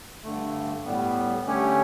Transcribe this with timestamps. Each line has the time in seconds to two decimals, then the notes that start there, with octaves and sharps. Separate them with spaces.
0.24 G2 D3 A3
0.84 A2 G3 B3
1.45 D3 A3 C#4 G4 C#5